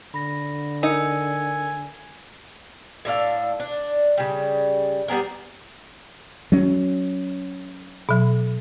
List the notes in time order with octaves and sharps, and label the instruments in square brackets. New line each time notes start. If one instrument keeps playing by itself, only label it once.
[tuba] D3 [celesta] B5 A#6
[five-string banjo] D#4 [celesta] A#4 E6 C#7 [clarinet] G#5
[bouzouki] A2 D4 A4 F5
D4
C#3 G3
G3 B3 G#4 A#4
[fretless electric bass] F#3 C#4
[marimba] B2 F#3